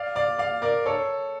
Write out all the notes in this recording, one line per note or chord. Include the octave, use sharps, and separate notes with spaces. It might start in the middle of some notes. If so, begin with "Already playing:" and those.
Already playing: D5 F5
D5 F5
D5 F5
A#4 D5
A4 C#5